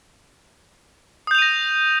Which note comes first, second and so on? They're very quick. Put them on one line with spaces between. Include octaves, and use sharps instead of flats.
D#6 G6 F7 D#7 A#6